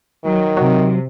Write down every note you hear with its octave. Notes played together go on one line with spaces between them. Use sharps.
D#3 F#3
C3 F#3